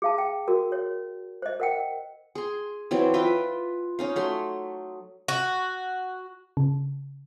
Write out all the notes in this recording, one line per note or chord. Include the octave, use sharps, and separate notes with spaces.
G#4 F5 A5
G5
F#4 A#4
C#5
C5 D#5
A#4 F#5 G5
G#4 C6
E3 F#3 C4 D5
F4 B4 E5 G5
C#4 D#4 F5
F#3 A3 C6
F#4
C#3